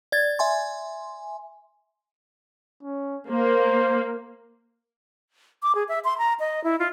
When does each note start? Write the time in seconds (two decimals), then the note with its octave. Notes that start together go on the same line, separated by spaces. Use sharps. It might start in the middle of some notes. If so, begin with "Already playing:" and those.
0.12 D5 G#6 A6
0.39 E5 G#5 C6
2.83 C#4
3.28 A#3 C5
5.63 D6
5.75 G#4
5.89 E5
6.04 C6
6.18 A#5
6.40 D#5
6.64 E4
6.79 F4